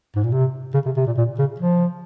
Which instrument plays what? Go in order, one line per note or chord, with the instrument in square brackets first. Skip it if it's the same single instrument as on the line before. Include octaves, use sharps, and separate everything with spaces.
[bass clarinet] G#2
A#2
C3
C#3
C3
C3
A#2
A#2
C#3
F3